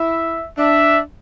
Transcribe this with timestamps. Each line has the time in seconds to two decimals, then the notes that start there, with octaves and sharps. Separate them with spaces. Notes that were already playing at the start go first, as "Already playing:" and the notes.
Already playing: E4 E5
0.58 D4 E5